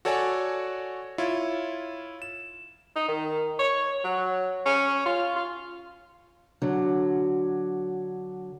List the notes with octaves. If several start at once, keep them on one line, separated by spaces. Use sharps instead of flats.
F#4 A4 C#5 D5 F#5 G#5
E4 F4 C#5
E7
D#4
D#3
C#5
F#3
C#4
F4
F4
D3 F#3